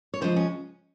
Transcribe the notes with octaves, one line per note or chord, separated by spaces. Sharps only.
C#5
C#3 F3 G#3 C5
C#4